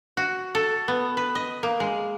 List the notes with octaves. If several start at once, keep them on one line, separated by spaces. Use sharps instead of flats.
F#4
A4
B3
B4
D#5
A#3
G#3